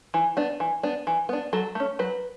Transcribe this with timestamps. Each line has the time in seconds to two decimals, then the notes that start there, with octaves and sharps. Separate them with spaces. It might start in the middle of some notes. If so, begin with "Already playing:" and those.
0.14 E3
0.37 B3 D4
0.60 E3
0.83 B3 D4
1.07 E3
1.29 B3 D4
1.53 F#3 A4
1.75 A3 C#4
1.99 F#3 B4